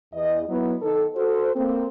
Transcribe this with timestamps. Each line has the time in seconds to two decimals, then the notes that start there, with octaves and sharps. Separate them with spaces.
0.13 E2 D#5
0.49 F#3 B3 E4
0.82 D#3 A4
1.15 F#4 A4 C5
1.56 A#3 C4